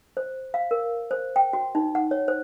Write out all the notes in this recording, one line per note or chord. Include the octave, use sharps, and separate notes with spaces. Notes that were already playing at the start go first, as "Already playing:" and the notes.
C5
F5
A#4
C5
G5
F#4
D#4
F#5
C#5
C5